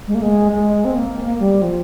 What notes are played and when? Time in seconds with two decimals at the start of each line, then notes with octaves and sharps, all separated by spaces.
0.08 G#3
0.15 A#3
0.22 G#3
0.52 G#3
0.85 C4
0.96 A#3
1.39 G3
1.62 F3